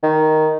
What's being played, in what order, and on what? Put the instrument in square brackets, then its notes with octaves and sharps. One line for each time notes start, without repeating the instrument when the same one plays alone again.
[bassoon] D#3